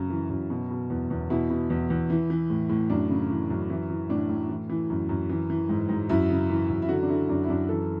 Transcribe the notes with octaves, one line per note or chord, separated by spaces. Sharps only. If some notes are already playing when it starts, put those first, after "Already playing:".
Already playing: F#2 C#3
E3
F#2
B2
B2
E2
E2
B2 E4
B2
E2
E2
E3
E3
A2
A2
F#2 D4
C#3
E3
F#2
E3 E4
E3
A2 D4
A2
E3
E3
F#2
F#2
E3
E3
G#2
G#2
F#2 E4
C#3
E3
F#2
E4
D3 F#4
D4
D3 E4
F#2 D4
E4
F#2 D4
E3 A4